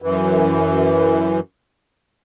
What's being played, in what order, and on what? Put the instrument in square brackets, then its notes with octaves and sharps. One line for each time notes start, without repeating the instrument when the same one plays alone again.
[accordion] F#2 E3